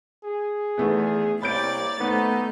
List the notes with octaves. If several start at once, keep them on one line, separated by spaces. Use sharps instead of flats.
G#4
E2 D#3 A3 B3
C2 A#3 C#5 D5 B5 G6 A6 D7
D#3 A3 B3 D#4 C5